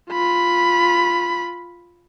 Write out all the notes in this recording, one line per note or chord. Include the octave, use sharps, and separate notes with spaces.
F4 B5